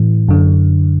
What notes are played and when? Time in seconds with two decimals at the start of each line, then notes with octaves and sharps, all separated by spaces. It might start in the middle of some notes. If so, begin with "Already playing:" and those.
Already playing: A2 E3
0.28 F#2 D3